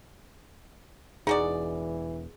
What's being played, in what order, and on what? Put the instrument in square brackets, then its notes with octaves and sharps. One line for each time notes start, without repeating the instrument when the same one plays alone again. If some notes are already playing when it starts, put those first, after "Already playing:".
[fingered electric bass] E1 [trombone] E3 [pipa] D#4 F#4 D5 [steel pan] G#4